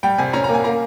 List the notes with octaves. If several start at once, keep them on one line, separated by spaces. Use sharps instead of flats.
G3 G5
C3 G#5
C#4 A#5
A#3 A#5
G#5
A#3 A#5